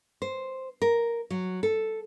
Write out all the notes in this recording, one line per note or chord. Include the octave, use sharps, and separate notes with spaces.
C5
A#4
F#3
A4